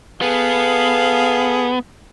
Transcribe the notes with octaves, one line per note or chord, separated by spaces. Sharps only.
B3 G#4 A4 F5